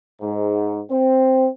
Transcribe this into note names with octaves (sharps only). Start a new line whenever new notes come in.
G#2
C4